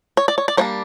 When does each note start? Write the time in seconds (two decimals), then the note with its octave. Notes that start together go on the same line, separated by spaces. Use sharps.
0.17 C#5
0.28 D5
0.38 C#5
0.48 D5
0.57 G3 A#3 D4 C#5